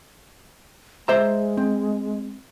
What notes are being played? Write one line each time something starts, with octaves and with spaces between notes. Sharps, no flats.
G#3 C5 E5 A#5
C4